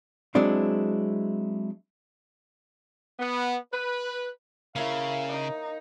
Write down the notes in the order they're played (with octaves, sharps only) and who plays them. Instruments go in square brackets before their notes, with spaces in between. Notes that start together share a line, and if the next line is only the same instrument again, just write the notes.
[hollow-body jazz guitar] F#3 G#3 C4 D4 E4
[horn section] B3
B4
[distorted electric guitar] C#3 [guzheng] A#3 C#5 [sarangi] E4 [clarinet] F5
[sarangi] D#4